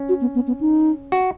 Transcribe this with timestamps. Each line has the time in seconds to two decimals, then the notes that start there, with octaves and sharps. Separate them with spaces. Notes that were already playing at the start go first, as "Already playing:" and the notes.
Already playing: C#4
0.09 F#4
0.21 B3
0.35 B3
0.47 B3
0.60 D#4
1.12 F#4